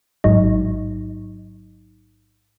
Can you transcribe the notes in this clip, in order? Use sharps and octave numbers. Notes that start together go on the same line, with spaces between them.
A1 G#2 F#3 D#4